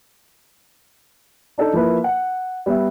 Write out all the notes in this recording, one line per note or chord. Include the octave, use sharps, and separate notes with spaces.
D4 D#4 A4
F3 A#3 E4 B4
F#5
G3 B3 E5